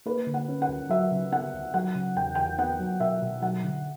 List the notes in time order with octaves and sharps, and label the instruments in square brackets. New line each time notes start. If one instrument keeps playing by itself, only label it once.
[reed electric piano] A#3 [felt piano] B4
[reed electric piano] D3
[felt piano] F#5
[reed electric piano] C#4
[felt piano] F#5
[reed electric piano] D2
[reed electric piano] F#3 [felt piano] E5
[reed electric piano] C#3
[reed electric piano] B3 [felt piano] F#5
[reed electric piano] D2
[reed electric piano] F#3 [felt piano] F#5
[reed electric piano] C#3
[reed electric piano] E2 [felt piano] G5
[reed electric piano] E2 [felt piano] G5
[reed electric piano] B3 [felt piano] F#5
[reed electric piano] F#3
[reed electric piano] B2 [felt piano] E5
[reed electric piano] B2
[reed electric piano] F#3 [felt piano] F#5
[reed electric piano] D3